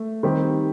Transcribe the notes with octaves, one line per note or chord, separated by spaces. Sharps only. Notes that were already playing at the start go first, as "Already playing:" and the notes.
Already playing: A3
D#3 G3 C4 D#4 G4